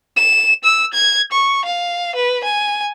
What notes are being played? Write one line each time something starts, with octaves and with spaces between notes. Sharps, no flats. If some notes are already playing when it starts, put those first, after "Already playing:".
E7
E6
G#6
C#6
F5
B4
G#5